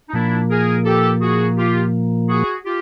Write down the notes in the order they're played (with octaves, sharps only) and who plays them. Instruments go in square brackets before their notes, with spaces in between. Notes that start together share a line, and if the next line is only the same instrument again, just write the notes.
[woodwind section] D#4
[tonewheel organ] A#2 F3 A#3 [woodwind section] D4 E4
[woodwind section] G#4 A#4
G4 A4
F#4 G#4
F4 G4
F#4 G#4
F4 G4